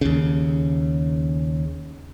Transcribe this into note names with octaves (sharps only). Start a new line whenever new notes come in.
D#2 C#3